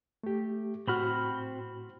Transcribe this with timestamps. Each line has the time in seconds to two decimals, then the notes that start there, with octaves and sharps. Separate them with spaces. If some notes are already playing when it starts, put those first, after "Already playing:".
0.23 A3 G4
0.87 A2 C4 F#4 B5 F6